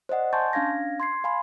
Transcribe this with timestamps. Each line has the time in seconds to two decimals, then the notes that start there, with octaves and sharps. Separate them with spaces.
0.09 C5 D5 D#5 F#5
0.33 G#5 A5 C6 C#6 G6 A6
0.53 C#4 D4 F5 G#6 A#6
1.00 C6 G#6 C7
1.24 F5 G#5 B5 C6